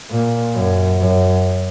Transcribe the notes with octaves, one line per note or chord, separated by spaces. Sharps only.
A#2
F#2
F#2